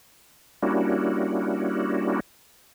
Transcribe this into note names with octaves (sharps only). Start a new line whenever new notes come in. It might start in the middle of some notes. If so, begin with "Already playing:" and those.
G3 A#3 C#4 D4 E4 F#4